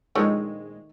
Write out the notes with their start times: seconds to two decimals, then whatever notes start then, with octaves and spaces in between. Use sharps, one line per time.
0.15 A#1 D#3 G#3 A3 C#5